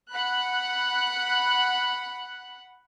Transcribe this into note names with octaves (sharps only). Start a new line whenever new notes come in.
F#5 B5 F#6